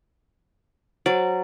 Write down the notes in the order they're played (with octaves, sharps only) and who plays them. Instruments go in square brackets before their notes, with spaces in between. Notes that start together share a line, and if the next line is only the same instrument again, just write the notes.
[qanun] F#3 [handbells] C5 A6